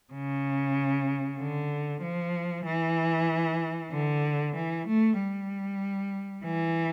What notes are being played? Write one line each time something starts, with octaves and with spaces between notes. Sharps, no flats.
C#3
D3
F3
E3
D3
E3
A3
G3
E3